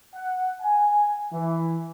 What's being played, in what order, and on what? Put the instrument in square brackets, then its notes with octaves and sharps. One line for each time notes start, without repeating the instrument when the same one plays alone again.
[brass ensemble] F#5
G#5
E3